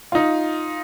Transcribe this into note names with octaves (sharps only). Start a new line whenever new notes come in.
D#4 F4